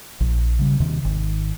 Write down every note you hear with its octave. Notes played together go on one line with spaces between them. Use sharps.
A#1
C#3 G3
D#2 C3 D#3
G#1 D#3